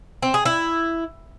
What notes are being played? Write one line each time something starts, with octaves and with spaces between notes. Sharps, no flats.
C4
G#4
E4